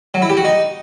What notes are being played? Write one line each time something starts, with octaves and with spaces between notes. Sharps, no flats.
F#3
E4
G4
F#4
D#4